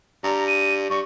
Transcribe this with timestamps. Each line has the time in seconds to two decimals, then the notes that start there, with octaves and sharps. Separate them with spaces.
0.24 G2 A#5
0.47 D#7
0.90 G2 C#6